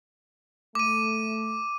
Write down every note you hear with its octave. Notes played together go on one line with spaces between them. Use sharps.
A3 D6 D#7